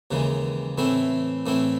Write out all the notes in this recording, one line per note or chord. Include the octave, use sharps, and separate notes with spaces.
D#2 C#3 E3 G#3
A2 E3 A3 C4 E4
A2 E3 A3 C4 E4